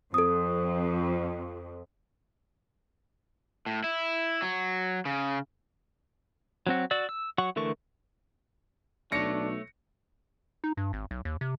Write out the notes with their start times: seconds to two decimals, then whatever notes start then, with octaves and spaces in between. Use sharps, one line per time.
0.14 F2 A4 D#6
3.66 A2
3.84 E4
4.42 F#3
5.05 C#3
6.67 F#3 C4 F#4
6.91 F#4 D5 E6
7.09 E6
7.38 F#3 F#5 C#6
7.56 D3 E3 A3 A#4 C#6
9.12 B1 A3 D4 C#5 A#6 C#7
10.64 D#4
10.77 G2
10.93 G#1
11.11 B1
11.25 D#2
11.41 C3